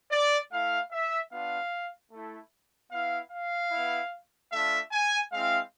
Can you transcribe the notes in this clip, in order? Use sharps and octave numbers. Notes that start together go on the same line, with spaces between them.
D5
A3 E4 F5
E5
B3 D4 F4 F5
A3 E4
B3 E4 F5
F5
B3 E4
A3 D4 F4 E5
G#5
G#3 C4 E4 F5